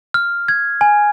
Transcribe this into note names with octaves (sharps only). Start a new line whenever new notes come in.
F6
G#6
G#5